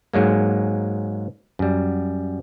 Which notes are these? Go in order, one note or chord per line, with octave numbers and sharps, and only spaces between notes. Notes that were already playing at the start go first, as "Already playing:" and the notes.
G#2 F#3 G#3 A#3
F#2 G3